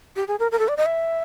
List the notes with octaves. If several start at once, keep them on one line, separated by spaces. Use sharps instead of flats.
G4
G#4
A#4
A#4
A4
D5
D#5
E5